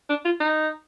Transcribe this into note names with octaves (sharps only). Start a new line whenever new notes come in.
D4
F4
D#4